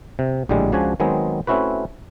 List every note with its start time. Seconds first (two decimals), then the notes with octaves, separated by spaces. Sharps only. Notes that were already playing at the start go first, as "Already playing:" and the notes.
0.19 C3
0.49 A#1 A2 D3 G3 G#3
0.72 C#2 C#3 F3 D4 F#4 G#5
1.00 D#3 F#3 G#3 B3 C4 G#4
1.47 A3 C4 C#4 E4 F#4 B4